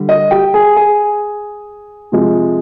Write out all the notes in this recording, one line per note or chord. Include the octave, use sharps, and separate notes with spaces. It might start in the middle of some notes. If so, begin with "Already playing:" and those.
Already playing: D3 G3
D#5
G4 G5
G#4 G#5
G#4 G#5
C3 F3 G#3